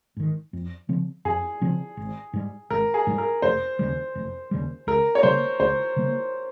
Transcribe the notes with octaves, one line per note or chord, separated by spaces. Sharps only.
G#2 D#3
F2
C#3 F3 C4
F2 G#4
C#3 F3 C4
G#1
G#2 G3
G#1 A#4
G#4
G#2 G3
A#4
F1 C5
D#2 C#3 G3
F1
D#2 C#3 G3
C#2 A#4
C#5
C#3 G3 A#3 C5
C#2 C5
C#3 G3 A#3